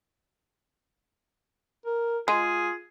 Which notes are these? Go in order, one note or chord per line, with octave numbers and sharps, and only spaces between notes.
A#4
G#3 F4 G#4